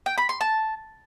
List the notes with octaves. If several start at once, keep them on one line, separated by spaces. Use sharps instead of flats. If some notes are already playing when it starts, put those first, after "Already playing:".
G5
B5
C6
A5